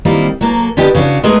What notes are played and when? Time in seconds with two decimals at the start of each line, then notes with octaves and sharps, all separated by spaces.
0.05 D#3 G3 A#3 C4 E4 F4
0.41 F#3 A#3 A4
0.77 D3 B3 D4 D#4 G4
0.95 C#3 C#4 D4 F#4
1.23 G#3 A3 B3 D#4 G#4 A#4